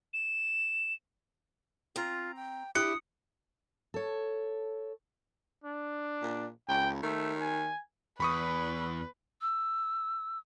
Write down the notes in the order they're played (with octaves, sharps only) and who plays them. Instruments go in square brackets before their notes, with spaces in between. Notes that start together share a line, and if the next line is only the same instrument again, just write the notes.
[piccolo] E7
[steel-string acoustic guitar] C4 A#5 [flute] F4
[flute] G5
[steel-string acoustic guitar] D4 E4 G4 [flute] D#6 [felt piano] F#6 [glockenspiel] C#7
[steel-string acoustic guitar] A4 C#5
[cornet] D4
[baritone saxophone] A#2
[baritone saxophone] C#2 [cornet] G5
[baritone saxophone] D#3 [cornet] A3
[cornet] G#5
[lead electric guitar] E2 [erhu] B4 [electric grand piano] B5 C#6 D#6
[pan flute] E6